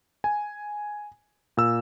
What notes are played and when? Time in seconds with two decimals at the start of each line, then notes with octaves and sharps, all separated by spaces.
0.24 G#5
1.57 A#2 E6